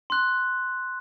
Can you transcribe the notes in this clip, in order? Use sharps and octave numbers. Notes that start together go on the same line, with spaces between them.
C6 F#6